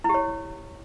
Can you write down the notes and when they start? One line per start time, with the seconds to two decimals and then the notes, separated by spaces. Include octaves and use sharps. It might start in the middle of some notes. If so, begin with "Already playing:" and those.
0.04 E4
0.09 G4
0.14 C#5